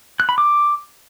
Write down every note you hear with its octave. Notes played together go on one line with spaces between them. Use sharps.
F#6
B5
D6